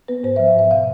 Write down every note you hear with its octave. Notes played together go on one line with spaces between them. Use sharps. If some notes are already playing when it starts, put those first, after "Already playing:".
B3 B4
G#2 C5
F3 E5
F5
G#2 E5
B2 F5